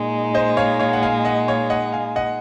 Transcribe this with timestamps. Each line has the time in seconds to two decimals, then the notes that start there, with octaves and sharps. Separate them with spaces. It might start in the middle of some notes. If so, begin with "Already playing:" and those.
Already playing: A#2 G#3 D#4
0.34 C5 D#5
0.57 C#5 F5
0.79 C#5 F5
0.93 F#5
1.03 F5 G#5
1.25 D#5 F#5
1.48 C#5 F5
1.70 D#5 F#5
1.93 F5 G#5
2.16 D#5 F#5